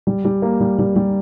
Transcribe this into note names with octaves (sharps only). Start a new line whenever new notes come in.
G3
G3
A#3
G3
G3
G3